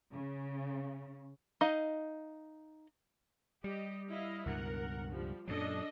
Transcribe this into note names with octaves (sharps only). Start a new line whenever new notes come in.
C#3
D#4 D#5 F5
G3 G4 D#5
E4 D#5 F5
C#2 G2 B2 A#4 F#5
F3 G3
F#2 A#2 F#3 D4 A4 D#5